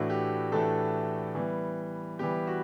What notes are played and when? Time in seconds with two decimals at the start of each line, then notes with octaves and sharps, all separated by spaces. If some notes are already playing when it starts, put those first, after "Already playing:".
Already playing: A2 E3 A3 D4 F#4
0.10 G4
0.52 A2 E3 A3 D4 A4
1.35 E3 G3 B3
2.19 E3 G3 B3 G4
2.47 F#4